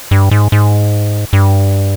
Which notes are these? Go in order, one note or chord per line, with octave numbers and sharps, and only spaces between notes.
G2
G#2
G#2
G2